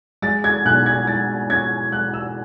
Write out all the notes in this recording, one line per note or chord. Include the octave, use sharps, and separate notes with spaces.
G#3 A6
G#6
B1 F#6
G#6
G#3 A6
C#4 G#6
G#3 F#6
E6